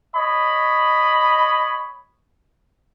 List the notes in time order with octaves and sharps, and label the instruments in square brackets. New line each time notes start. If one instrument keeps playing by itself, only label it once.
[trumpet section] C#5 D#5 B5